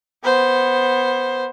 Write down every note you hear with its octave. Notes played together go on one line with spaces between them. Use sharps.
B3 C5